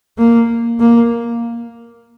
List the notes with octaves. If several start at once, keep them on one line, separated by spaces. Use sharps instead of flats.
A#3
A#3